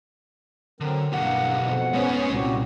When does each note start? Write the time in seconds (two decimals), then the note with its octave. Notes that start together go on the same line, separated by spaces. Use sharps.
0.80 D3 F#3 C4 A#4
1.13 B1 G2 A#3 G4 F#5
1.58 F2 G#2 B2
1.93 G#3 B3 C#4 C5
2.33 C2 A#2 F#4 G4